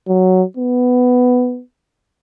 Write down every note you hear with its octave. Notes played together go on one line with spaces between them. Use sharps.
F#3
B3